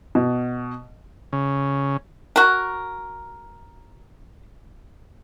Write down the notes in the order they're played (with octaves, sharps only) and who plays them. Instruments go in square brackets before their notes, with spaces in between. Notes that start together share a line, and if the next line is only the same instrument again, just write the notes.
[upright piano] B2
[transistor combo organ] C#3
[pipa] F#4 A#4